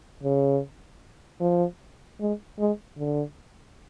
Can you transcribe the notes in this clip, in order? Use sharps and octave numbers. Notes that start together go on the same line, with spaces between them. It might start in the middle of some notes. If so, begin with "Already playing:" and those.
C#3
F3
G#3
G#3
D3